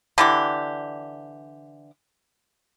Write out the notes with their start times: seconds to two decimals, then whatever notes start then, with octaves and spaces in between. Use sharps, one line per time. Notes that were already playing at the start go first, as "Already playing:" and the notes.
0.18 D3 E3 G4